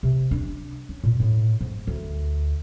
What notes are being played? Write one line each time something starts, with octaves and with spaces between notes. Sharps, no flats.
C3
D4
C#4
A#2
A2
G#2
D2